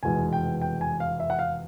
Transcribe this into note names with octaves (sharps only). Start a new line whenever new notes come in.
F1 E2 B2 G#3 G#5
G5
G5
G#5
F5
E5
F#5
F5